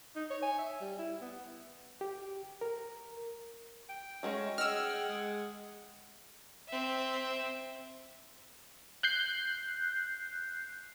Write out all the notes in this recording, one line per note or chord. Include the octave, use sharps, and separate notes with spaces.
D#4
C#5
G#5
E5
G3
E4
B3
G4
A#4
G5
F#3 G#3 A3 C#4
G#4 D#5 F#5 E6 F6
G#3
C4 E5
F#6 G6 C7